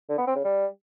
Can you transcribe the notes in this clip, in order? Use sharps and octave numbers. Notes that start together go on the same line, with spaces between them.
D3
B3
C4
C#3
G3